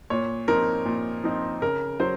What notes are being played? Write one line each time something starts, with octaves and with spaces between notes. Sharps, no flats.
A#2 C#5
F3 C4 D#4 A#4
A#2
F3 C4 D#4
C#3 A#4
F#3 C5